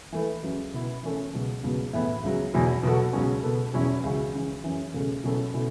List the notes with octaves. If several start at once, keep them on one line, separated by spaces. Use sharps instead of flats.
E3 A3 E4 B4
C#2 C#3 F#3
B2 B3 E4 B4
E3 A3 C#4 A4
C#2 B2 F#3
C#2 B2 F#3 B3
A2 E3 B3 E4 B4
C#2 C#3 F#3
E2 B2 F#3 B3 E4
B2 F#3 B3 F#4 A4
C#2 B2 F#3 C#4
B2 B3 A4
E2 B2 F#3 C#4 E4
C#2 C#3 E3 C#4 F#4
C#2 C#3 E3
F#2 C#3 E3
C#2 B2 A3 C#4
B2 F#3 C#4 E4 A4
B2 A3 C#4 E4